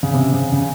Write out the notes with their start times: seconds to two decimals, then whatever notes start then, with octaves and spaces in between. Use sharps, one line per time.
0.03 C#3
0.14 C3
0.33 C#3
0.52 C#3